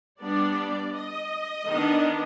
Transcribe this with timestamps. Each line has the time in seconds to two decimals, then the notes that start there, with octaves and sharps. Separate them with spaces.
0.20 G3 B3 D4 D5
0.94 D#5
1.69 D#3 B3 D4